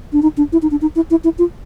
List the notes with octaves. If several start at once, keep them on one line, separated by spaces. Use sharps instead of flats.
D4
D#4
D4
E4
D#4
D4
D#4
E4
E4
E4
F4